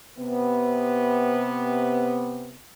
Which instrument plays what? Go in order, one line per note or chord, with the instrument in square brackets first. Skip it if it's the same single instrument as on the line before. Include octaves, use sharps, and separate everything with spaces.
[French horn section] C3 B3